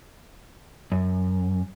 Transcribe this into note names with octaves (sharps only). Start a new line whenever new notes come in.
F#2